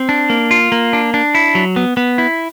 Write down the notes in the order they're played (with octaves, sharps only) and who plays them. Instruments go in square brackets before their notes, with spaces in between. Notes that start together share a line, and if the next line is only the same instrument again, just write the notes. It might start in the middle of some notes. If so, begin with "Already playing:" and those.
Already playing: [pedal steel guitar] C4
D4
A#3
F4
A#3
D4
D4
E4
F#3
B3
B3
E4